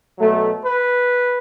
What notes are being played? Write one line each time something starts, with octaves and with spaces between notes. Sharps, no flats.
B2 F#3 A3
B4